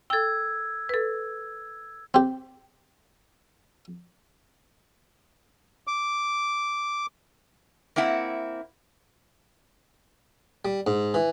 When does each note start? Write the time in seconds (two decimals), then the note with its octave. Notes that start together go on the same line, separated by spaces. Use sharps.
0.10 A4 G5 E6 G#6
0.89 A4 B4
2.14 C4 G4
5.87 D6
7.96 A#3 C4 E4 F#5
10.65 G3
10.87 G#2
11.14 E3